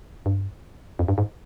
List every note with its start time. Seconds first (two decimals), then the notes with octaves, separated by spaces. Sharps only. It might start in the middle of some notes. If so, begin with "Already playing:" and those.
0.26 G2
0.99 F2
1.08 G2
1.18 G#2